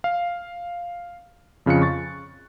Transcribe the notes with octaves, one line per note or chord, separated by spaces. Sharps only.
F5
F2 C#3 F4 F#6 C#7
C#6 A6